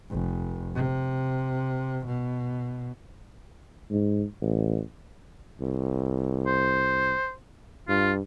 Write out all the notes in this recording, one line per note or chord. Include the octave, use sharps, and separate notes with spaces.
F1
C3
B2
G#2
A1
C2
C5
G2 F4